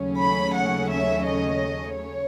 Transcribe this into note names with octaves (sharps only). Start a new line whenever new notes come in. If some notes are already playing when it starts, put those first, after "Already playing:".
Already playing: D#2 C#3 F#3 A3 C#4
B5
F#5
E5
D#5
C#5